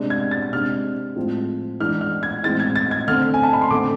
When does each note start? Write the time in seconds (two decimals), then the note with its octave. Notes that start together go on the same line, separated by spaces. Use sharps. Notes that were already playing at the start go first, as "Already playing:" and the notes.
Already playing: C3 G#3 D4
0.10 G#6
0.31 A6
0.53 C3 G#3 D4 F6
1.16 A2 F3 G#3 C4
1.80 E3 G#3 D4 F6
2.01 F6
2.23 G#6
2.43 A2 E3 G#3 C4 A6
2.60 G#6
2.76 A6
2.91 G#6
3.08 D3 A3 C4 F6
3.34 G#5
3.43 A5
3.53 B5
3.61 C6
3.70 D3 A3 C4 D6